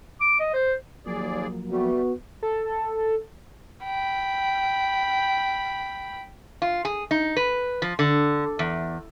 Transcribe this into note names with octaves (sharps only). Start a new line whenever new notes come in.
D6
D#5
C5
D#2 F3 F#3 A#3 G#4 D5
G3 A3 B3 F#4
A4
G5 B5
F4
G#4
D#4
B4
F3
D3
E2